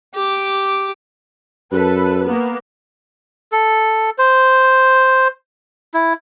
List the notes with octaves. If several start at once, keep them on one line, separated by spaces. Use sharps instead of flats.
G4 D6
F#2 A4 B4
A#3 B3
A4
C5
E4